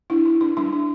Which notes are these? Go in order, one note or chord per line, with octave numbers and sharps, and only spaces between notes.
D4 E4
D4
D4
G3 D4
D4